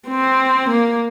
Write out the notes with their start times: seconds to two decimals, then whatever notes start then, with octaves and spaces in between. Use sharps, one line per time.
0.08 C4
0.70 A#3